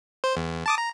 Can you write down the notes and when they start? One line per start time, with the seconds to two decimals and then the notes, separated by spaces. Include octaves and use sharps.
0.24 C5
0.37 E2
0.66 A5 D6 D#6
0.78 A#5